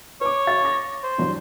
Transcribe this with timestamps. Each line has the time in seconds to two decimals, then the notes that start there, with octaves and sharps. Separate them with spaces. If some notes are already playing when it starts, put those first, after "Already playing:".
0.21 B4 C#5 D6
0.47 F#4 F5 A6
0.61 C#6 D6 A#6
1.03 C5
1.18 E2 G2 F#3